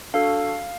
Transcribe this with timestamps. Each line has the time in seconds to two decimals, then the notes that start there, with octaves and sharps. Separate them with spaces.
0.14 D4 F#4 A4 F5